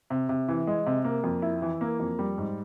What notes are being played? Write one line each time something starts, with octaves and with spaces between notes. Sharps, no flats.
C3
C3
E3
G#3
C3
A#3
F2
E4
E3
A#3
F2
G3
G#2